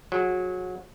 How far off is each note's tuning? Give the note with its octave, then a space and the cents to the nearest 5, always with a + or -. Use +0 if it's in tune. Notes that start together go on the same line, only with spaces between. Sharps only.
F#3 -25 G#4 -5